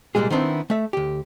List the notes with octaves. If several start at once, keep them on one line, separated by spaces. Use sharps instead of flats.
C2 A#2 D#3 G3 G#3 G#4
D#3 B3 C4 D4 E4
A3 E5
D2 G4